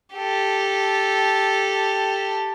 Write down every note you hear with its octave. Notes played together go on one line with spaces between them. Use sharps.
G4 A4